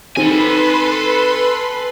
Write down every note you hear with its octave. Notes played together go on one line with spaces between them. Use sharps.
D#3 C4 A4 B4 G#5 B5 C6